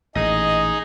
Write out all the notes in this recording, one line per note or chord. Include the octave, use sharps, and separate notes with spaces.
A1 A#2 D#4 G#4 D#5